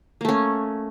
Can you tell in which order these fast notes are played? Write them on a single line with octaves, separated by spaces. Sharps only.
A#3 A3 C#4